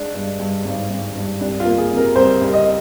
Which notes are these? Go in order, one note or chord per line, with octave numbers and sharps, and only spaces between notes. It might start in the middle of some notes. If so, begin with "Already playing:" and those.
Already playing: G#3 D4
G2
G2
G#1
G#1
G2
C2 D4
F4
A#3
G#4
C3
A#4
C2 C5
C2
D#5